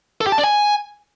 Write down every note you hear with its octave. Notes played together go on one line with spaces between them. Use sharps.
A4
G4
A5
D5
G#5